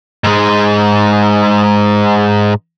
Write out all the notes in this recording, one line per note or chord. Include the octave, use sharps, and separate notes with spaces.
G#2 G#3